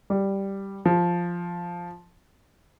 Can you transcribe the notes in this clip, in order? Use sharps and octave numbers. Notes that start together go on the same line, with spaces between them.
G3
F3